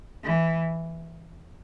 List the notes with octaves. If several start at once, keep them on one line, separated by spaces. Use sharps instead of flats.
E3